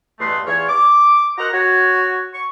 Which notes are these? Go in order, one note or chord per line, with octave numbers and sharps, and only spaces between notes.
E2 G2 A3 B4 D#5 C6
E2 F4 C#5
D6
F#4 A#4 C5 D#5 F#5 A#5
F#4 C#5
C#6